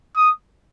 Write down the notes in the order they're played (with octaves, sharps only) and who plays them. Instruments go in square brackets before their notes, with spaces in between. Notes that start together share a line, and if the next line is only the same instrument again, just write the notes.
[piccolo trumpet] D#6